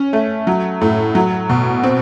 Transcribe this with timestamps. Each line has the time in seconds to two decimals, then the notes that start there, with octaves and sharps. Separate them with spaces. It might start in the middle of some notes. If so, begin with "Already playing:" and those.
Already playing: C#4
0.13 A3
0.47 F#3
0.81 A2
1.15 F#3
1.49 B2
1.83 C4